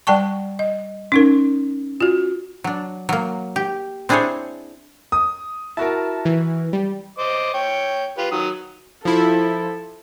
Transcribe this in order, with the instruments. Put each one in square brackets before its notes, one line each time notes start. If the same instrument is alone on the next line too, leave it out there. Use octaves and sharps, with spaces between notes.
[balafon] G3 D5 G5 A5 C#6
D#5
C#4 D#4 A#4
F4 F#4
[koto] F#3 D4
F#3 A#3
G4
C4 D4 E4 G#4 C5 C#5
[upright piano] D#6
[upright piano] E4 F#4 A#4 [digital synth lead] A5
[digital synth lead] E3
G3
[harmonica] C5 D#5 D6
C#5 G5
F4 G4 B4
D#3 F#3 D#6
[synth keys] F3 E4 [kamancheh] A4